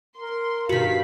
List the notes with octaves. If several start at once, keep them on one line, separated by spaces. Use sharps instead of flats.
A#4 C6
G2 D#3 F#4 F5 B6